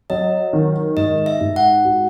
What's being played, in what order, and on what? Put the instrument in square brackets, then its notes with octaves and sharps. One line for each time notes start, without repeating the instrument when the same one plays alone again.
[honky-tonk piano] F#3 [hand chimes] D#5
[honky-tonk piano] D#3
[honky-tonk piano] G#2 [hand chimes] D#5
[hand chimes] E5
[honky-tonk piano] G#2
[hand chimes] F#5
[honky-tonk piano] F#4